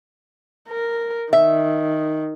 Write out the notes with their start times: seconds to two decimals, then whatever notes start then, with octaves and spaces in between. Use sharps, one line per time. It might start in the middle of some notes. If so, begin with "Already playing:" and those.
0.69 A#4
1.33 D#3 E5